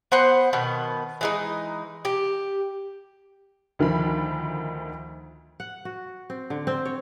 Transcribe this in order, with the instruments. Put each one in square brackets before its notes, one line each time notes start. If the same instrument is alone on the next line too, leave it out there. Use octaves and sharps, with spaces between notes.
[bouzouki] B3 C5 F#5
B2 D#3 B3
E3 G#3 D#4
G4
[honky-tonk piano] D2 D#3 F3 B5
[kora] F#5
F#4
C4
D3
C4
C#5